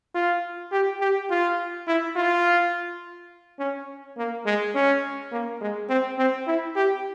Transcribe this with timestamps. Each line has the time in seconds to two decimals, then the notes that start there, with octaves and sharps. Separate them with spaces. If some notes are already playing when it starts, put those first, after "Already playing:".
0.14 F4
0.72 G4
1.01 G4
1.30 F4
1.87 E4
2.16 F4
3.59 C#4
4.17 A#3
4.46 G#3
4.75 C#4
5.32 A#3
5.61 G#3
5.89 C4
6.19 C4
6.47 E4
6.76 G4